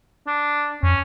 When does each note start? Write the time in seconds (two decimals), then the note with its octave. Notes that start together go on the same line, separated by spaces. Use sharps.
0.27 D4
0.83 F2 C#4